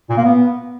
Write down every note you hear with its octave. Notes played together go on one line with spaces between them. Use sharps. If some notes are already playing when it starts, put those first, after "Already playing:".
A#2
A#3
B3